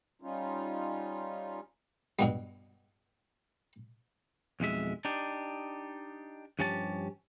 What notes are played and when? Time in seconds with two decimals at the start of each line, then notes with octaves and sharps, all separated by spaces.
0.22 G3 C#4 D#4 F4
2.19 G2 B2 G3
4.60 B1 F2 G#3 E5
5.05 D4 D#4 G4
6.59 G2 F3 C#4 G4 A5